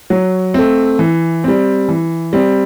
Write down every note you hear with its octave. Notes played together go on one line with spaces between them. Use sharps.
F#3
A3 C4
E3
G3 C4
E3
G3 C4